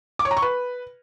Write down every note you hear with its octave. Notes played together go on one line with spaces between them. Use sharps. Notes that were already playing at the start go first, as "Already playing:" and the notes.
D6
C#5
A#5
C#6
B4